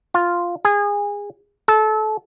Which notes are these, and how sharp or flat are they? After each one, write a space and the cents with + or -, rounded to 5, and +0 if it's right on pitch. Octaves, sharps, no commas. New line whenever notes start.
F4 +0
G#4 -25
A4 -25